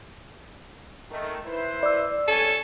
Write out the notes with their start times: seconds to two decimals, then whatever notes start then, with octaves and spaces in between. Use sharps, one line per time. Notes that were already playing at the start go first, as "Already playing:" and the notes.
1.11 D#3 A3
1.45 E4 B4 C5
1.83 D5 E6
2.28 G1 C#4 A4 G#5